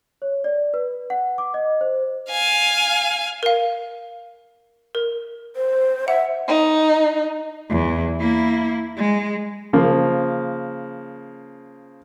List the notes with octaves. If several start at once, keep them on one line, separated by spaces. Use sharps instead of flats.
C#5
D5
B4
F#5
D6
D#5
C5
F5 G#5
A#4 F5
A#4
C5
E5 F#5
D#4
E2
A#3 E4
G#3
C#3 F3 A#3